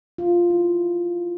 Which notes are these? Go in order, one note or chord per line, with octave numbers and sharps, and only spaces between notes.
F4
E4